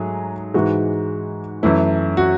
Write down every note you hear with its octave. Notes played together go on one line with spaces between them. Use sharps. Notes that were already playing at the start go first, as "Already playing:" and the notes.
Already playing: G#2 F#3 A3 G#4
G#2 E3 G#3 F#4
F#2 E3 A3 E4
F#4